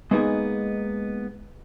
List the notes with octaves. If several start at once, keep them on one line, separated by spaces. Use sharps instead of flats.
G#3 A#3 B3 D#4 G#4